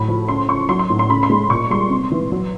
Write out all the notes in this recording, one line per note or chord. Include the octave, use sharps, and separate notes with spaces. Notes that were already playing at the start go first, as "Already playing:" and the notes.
Already playing: A2 F#3 B5
F3
C#3 C6
C#3 C#6
F#3 C6
C6
A2
C6
C#3 B5
C6
G#3
A#2 C#6
G3 C6
C3
E3
F#3